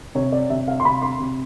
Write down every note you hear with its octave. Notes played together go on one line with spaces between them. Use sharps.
C3 C#5
D5
C3 E5
F5
C6
C3 B5
C6
C3